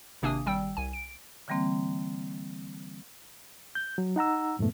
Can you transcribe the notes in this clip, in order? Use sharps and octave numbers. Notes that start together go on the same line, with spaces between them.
G#1 C3 A#3 D4 G#5 D#6
G#1 G3 G5 E6
C2 G#5
D7
D3 E3 G3 A#3 C4
G6
F#3
D#4 F#5 A#5 E6
F2 G#2 B2 A3 B3